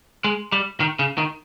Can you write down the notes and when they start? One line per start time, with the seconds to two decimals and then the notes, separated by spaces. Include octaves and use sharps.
0.25 G#3
0.52 G3
0.80 D#3
0.99 C#3
1.18 D#3